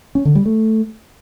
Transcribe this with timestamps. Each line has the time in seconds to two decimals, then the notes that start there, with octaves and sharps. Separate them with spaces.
0.15 C#4
0.25 D3
0.35 G3
0.46 A3